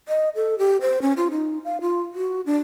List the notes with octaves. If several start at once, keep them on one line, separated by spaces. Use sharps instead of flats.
D#5
A4
G4
C5
C#4
F4
D#4
F5
F4
F#4
D4